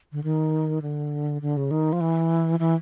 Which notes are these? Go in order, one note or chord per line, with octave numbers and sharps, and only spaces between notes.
D3
D#3
D3
D3
C#3
D#3
F3
E3
E3